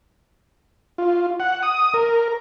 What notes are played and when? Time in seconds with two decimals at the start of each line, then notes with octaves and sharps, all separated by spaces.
0.98 F4
1.40 F#5
1.63 D#6
1.94 A#4